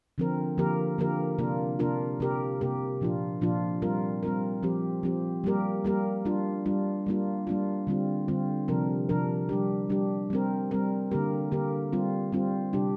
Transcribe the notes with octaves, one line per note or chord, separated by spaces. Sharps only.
D3 F3 C4 A#4
D3 F3 A#3 G4 A#4
D3 F3 A#3 G4 A#4
C3 A#3 D4 F4 A#4
C3 A#3 D4 F4 A#4
C3 A#3 G4 A#4
C3 A#3 G4 A#4
A#2 F3 D4 F4
A#2 F3 D4 F4
G3 C4 F4 A#4
G3 C4 F4 A#4
F3 C4 G4
F3 C4 G4
G3 A#3 G4 A#4
G3 A#3 G4 A#4
G3 D4 F4
G3 D4 F4
G3 A#3 D4 F4
G3 A#3 D4 F4
D3 G3 C4 F4
D3 G3 C4 F4
C3 F3 D4 A#4
C3 F3 D4 A#4
G3 D4 G4
G3 D4 G4
G3 C4 A#4
G3 C4 A#4
D3 A#3 G4 A#4
D3 A#3 G4 A#4
G3 C4 F4
G3 C4 F4
C3 G3 D4 G4